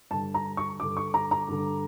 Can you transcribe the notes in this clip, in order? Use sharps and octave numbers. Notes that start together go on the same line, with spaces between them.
G2 D3 A5
A#5
C#6
G2 D3 D6
C#6
A#5
A#5
G2 D3